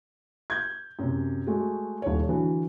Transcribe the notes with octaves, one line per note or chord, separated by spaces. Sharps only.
G6 G#6
F#2 C3
G#3 A3 F#4
D#1 C#5
D3 E3 F#3